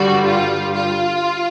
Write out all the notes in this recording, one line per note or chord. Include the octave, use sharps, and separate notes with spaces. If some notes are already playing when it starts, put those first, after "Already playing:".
Already playing: G2 D3 G3 F#4
F4
F4